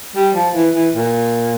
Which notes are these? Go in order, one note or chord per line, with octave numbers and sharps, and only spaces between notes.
G3
F3
E3
E3
A#2